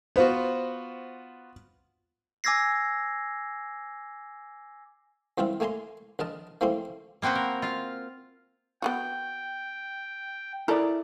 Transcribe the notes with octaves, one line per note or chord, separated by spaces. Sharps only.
B3 F4 F#4 C5
G#5 D6 E6 G#6 A#6 C7
C2 E3 C4 E4 F4
A3 A#3 G#5 A#5 C6
A#1 A#4 D#5 A5
E3 F3 A3 A#3 C4 C6
A#3 C4 F#4 B4 C5
A#4
F4 F5
B3 F4 F#4 G5
E4 A4 A#4 D5